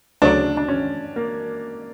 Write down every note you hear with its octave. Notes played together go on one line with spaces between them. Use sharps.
D2 C#3 F#3 D4
D4
C#4
A#3